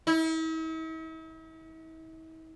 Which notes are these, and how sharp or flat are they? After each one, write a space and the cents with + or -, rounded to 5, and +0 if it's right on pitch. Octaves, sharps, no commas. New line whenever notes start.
E4 -45